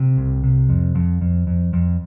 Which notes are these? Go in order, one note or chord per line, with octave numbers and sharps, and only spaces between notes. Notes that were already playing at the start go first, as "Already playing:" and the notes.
Already playing: C3
C2
C3
F2
F2
F2
F2
F2